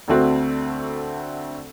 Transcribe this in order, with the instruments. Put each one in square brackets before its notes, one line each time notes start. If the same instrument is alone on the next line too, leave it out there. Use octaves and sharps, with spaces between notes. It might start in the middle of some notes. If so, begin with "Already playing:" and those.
[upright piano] D2 D3 A3 C4 F#4